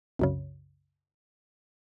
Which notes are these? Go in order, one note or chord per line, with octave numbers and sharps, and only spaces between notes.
C2 F#2 C#3